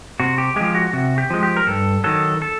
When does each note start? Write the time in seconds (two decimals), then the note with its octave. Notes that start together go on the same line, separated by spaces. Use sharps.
0.20 C3 F#4
0.38 G4
0.56 F3 G#3 G4
0.75 F#4
0.93 C3 F#4
1.18 G4
1.30 F3 G#3
1.43 G4
1.57 A#4
1.67 G2 A4
2.04 D#3 F#3 A4
2.42 A4